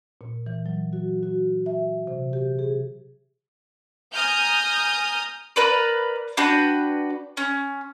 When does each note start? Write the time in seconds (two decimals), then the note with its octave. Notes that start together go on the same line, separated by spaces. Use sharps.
0.21 A#2
0.46 E3
0.66 F#3
0.93 F#4
1.23 F#4
1.66 E5
2.07 C3
2.33 G4
2.59 G#4
4.13 G#5 A#5 D#6 F6 G6
5.56 A#4 B4 D5
6.37 D4 F#4 B4 G5
7.37 C#4